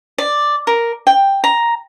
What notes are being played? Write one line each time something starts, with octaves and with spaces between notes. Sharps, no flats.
D5
A#4
G5
A#5